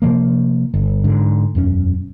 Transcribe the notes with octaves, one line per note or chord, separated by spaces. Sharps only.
C3 F3 A#3
G1
G#2 D3
E1 F#2 C#4